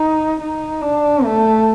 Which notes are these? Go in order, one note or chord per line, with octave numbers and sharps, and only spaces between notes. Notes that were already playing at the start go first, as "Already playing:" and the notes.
Already playing: D#4
D#4
D4
A3